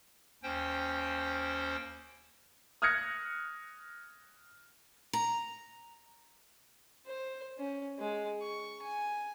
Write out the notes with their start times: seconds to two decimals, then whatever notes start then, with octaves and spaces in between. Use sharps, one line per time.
0.43 D#2 C#4 C5 G5
2.82 D#6 F6 F#6 G#6 A#6 C#7
5.13 A#5
7.06 C5
7.58 C#4
7.99 G#3
8.41 C#6
8.82 G#5